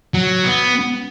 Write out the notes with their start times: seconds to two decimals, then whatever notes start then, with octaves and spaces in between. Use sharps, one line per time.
0.14 F#3
0.44 B3